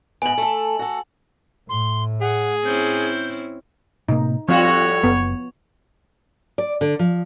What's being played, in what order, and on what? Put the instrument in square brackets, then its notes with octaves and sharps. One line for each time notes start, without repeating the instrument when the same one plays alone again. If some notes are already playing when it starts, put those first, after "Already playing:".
[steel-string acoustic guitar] G#2 B3 [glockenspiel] G#5 F#7
[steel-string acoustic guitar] A3 A4
F#4 A4
[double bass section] A2 [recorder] C6
[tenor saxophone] G#4 [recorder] F#5
[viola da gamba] C4 C#4 E4 [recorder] G6
[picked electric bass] A2 C3 A#3 [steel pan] D#4
[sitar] A2 G3 F#4 [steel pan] F3 F4 [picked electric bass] C4 [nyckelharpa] C#5
[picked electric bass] F#1 [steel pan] B3
[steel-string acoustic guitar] D5
D3
F3